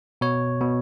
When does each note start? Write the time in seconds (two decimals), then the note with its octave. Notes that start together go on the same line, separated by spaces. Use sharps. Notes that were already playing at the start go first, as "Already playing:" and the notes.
0.21 B2 C#5
0.61 B2